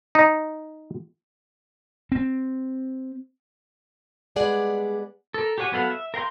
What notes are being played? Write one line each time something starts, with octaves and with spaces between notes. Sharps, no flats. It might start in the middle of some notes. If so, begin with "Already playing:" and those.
D#4
C4
G3 G#3 B3 G#4 D5 F#5
A4 A#4
G4 G#4 C#5 F#5 G#5
F#3 B3 A4 F5 F#5
E5
A#4 F5 G5 C6